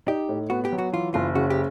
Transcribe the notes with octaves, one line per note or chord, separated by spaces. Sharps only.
D#4 G4
A2
B3 F#4
G4
F#3
F#4
E3 F4
F#1 F4
C#3 F#4
G4